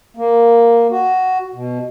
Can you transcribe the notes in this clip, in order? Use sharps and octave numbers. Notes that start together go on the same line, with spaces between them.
A#3
F#4
B2